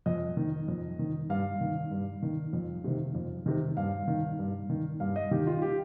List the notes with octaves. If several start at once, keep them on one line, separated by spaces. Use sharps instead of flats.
F2 D#5
D#3
F2
D#3
G2 F5
D#3
G2
D#3
F2
C3 D#3
F2
C3 D#3
G2 F5
D#3
G2
D#3
G2 F5
D#5
D#3 G4
F4
G4